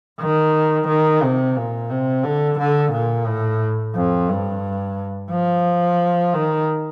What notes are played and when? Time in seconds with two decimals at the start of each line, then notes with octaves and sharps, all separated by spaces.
0.20 D#3
0.88 D#3
1.22 C3
1.56 A#2
1.90 C3
2.24 D3
2.58 D3
2.92 A#2
3.27 A2
3.95 F2
4.29 G2
5.30 F3
6.33 D#3